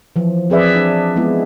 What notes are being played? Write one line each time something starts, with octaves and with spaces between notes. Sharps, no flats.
E3 F3
F3 C4 G#4 B4 D5 E5
D4
G#3 B3 E4